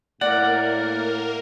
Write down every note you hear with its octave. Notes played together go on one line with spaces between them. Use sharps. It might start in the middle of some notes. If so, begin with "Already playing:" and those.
A2 A#3 A#4 D5 F#5